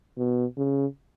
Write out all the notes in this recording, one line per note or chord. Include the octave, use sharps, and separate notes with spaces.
B2
C#3